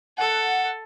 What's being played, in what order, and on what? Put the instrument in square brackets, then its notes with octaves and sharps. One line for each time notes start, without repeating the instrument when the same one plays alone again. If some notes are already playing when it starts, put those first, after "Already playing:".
[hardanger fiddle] A4 [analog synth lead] F#5